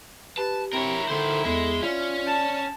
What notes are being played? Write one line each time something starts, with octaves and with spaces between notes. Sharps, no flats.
G4 B4 A5
C4 E4 A#4 C#5
D3 D#3 A4 C5
E2 G#3 A4
C#4 F4 D5
A5